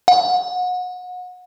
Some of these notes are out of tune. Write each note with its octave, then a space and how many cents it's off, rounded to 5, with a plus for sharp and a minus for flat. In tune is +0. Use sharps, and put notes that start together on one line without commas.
F#5 -30